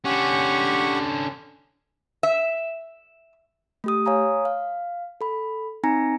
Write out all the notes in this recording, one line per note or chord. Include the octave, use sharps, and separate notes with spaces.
D3 C#4 G4 F#5 C#6
E5
A3 G4 D#6
C#5 F5 G#5 A#5 D#6
F5
A4 B5
C4 D#4 G#5 A#5 A#6 C#7